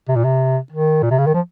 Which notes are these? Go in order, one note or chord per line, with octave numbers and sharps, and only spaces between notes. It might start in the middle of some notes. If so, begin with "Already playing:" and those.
C3
A#2
C3
D#3
A#2
C3
C#3
D#3
F3